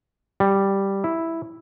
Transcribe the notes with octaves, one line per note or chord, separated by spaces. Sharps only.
G3
E4